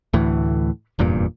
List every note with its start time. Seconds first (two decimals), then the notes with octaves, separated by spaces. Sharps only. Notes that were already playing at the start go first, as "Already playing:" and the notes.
0.13 D2 A2 E3
0.99 F1 E2 G2 A#2